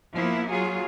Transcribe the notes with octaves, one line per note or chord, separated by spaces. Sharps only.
F3 A#3 B3 E4
F#3 F4 G#4